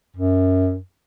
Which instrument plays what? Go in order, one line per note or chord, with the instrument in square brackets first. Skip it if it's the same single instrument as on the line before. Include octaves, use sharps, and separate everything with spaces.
[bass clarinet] F#2